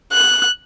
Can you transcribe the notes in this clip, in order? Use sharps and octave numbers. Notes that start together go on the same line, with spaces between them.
F#6